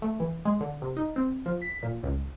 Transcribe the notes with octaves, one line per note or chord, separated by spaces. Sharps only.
A3
E3
G#3
D3
C3
D#4
C4
F3
B6
A#2
C#2